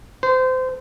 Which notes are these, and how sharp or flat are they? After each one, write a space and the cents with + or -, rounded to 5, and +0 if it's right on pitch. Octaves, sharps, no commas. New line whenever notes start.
C5 -25